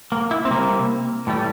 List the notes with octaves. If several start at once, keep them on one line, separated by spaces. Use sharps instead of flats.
A#3
E4
C4
C3 G3 A#3
A2 E3 G3